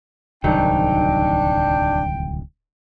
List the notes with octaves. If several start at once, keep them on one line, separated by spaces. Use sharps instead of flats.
D1 C2 D#3 F#3 D4 D#4 G5